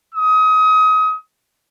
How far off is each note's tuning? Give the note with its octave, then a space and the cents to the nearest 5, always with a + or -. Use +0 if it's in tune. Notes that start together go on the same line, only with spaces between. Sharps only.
D#6 +30